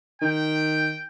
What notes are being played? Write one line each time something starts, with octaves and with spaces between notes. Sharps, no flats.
D#3 G5